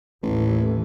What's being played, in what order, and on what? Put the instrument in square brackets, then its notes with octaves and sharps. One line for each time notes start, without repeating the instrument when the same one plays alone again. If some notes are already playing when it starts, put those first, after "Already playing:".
[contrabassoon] A1 [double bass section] D#2 A2 E3